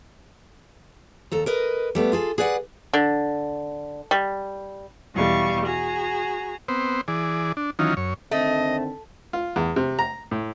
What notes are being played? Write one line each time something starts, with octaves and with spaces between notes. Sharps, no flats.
D#2 A4 A#5
A#4 B4 D#5
G3 A3 B3
F4 G#4 A4
G#4 B4 D5 E5 F#5
D3
G3
E2 B2 G3 F5 C#6
F#4 G#4 A#5
B3 C4 C5
E3 G#4 D5
D4
D#3 E3 F#3 C#4 D#4 F4
F#2 C#5
D3 D#3 A3 C4 D#5
F4
E2
C3
A#5
A2